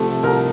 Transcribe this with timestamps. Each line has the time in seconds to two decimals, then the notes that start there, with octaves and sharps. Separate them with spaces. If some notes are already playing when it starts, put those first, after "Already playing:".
Already playing: C2 C3 F3 A3 A4
0.23 C2 A#4